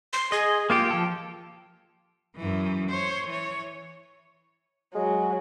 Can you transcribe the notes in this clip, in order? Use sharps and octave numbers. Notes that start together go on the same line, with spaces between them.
C6
G#4 D#5
A#3 F4 G4 G5
F3 A4
F#2 E3
C5 C#5
E3 C#5
F#3 G#3